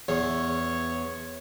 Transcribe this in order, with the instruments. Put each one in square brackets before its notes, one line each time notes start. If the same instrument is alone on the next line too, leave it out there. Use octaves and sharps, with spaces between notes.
[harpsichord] E2 [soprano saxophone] C#5